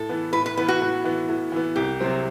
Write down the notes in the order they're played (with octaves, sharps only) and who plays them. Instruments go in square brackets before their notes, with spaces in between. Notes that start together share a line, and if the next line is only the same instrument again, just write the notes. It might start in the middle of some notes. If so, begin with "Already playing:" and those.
Already playing: [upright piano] A2 [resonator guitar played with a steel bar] A4
[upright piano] E3 B3
[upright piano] A2 [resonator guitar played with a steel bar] B4
[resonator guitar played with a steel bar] B4
[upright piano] E3 B3 [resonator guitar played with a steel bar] B4
[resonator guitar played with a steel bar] F#4
[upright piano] A2
E3 B3
A2
E3 B3
[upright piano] C2 [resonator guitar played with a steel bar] G4
[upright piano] C3 F#3 C4